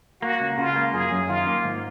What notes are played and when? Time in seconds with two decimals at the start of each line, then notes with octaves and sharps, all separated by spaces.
0.22 A#3 F#4
0.40 C#2
0.58 C#3 F4
0.76 A#3
0.93 F#2 G#4
1.12 F#2
1.28 D#3 F4
1.46 A#3
1.64 G#2